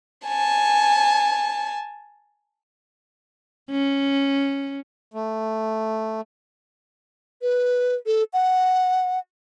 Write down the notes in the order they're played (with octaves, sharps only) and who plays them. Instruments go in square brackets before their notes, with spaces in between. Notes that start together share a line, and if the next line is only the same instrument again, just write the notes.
[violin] G#5 A5
[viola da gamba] C#4
[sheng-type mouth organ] A3
[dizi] B4
A4
F#5